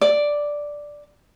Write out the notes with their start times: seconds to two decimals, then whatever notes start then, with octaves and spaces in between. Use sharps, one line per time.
0.01 D5